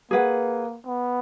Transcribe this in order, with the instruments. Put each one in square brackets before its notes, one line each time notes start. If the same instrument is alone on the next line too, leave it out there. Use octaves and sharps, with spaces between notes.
[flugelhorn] A#3 [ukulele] G#4 B4 F#5
[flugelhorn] B3